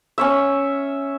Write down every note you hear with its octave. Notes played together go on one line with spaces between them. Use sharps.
C#4 C#5 E5